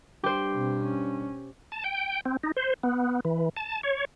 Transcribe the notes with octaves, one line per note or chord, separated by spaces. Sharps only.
G2 G4 C5
B2 C4
C#4
A5
G5
C4
D#4
C5
B3
E3
A5
C#5